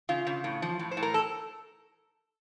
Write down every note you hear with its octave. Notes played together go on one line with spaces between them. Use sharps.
C#3 F4
C#3
A2
F3
A2
C5
A2
A#4
A4